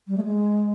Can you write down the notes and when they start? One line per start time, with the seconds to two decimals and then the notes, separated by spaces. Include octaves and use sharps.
0.08 G3
0.17 A3
0.24 G#3